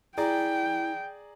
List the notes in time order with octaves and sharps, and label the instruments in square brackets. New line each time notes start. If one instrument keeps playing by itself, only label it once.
[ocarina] E4 [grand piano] G#4 D5 A#5 [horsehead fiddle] G5